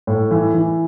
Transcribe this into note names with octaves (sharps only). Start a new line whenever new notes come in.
A2
E3
E3